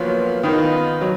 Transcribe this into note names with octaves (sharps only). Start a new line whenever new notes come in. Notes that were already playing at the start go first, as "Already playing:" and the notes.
Already playing: A#2 F3 F#3 B3 F4
D#3 B3 F4 B4 D#5
F#3